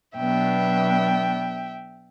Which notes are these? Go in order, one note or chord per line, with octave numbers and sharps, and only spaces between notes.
B2 F#3 B3 D4 E5 G5